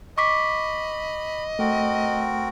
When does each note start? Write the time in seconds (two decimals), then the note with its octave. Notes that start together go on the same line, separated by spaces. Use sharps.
0.18 D#5 B5 C#6 D6 B6
1.59 A3 C4 F#4 A#4